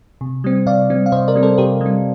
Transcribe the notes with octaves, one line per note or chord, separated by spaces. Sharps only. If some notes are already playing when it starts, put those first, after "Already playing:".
C3
G3 C4
C3 D5 F5
G3 C4
F5
C3 C5 D#5
A#4 D5
G3 C4
A4 C5
C3 G4 A#4
G3 C4